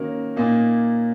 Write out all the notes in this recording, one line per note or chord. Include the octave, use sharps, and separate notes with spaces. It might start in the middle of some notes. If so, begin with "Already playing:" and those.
Already playing: D#3 A#3 C#4 F#4 A#4
A#2 A#3 D#4